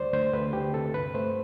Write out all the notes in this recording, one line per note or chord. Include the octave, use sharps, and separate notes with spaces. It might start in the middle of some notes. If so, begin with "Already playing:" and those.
Already playing: D2 G3 C5 D5
D2 C5
D2 B4
D2 G4
C3 A4
G2 B4
A3 C5